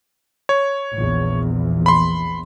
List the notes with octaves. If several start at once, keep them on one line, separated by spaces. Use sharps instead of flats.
C#5
A#1 E2
B5 C6